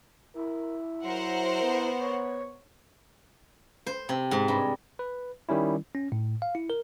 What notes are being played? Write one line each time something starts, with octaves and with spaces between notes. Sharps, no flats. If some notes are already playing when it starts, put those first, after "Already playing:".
E4 A#4
F#3 A#4 C5 F#5
B3
C#5
C5
C3
G#2
G2
B4
D#3 G3 C#4 E4
C#4
A2
F5
E4
A#4